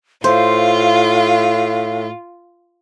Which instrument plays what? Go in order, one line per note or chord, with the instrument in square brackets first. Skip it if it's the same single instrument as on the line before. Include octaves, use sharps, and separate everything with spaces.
[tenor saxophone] A2 [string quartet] F4 [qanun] C5 [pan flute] F5